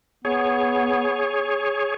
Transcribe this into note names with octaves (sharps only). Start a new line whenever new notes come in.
B3 G#4 C#5